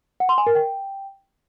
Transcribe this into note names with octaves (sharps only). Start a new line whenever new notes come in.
F#5
C6
G#5
A#4
G5